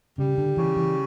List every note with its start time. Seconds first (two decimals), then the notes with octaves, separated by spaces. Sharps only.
0.18 C#3 G3
0.38 D3
0.57 C#3 E3
0.76 E3